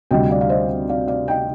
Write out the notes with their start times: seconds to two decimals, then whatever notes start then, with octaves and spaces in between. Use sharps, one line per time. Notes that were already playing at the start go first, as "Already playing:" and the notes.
0.11 D2 C3 G3 D#5 G5
0.30 D5 F5
0.41 F5
0.49 C5 D#5
0.89 D5 F5
1.08 D5 F5
1.28 D#5 G5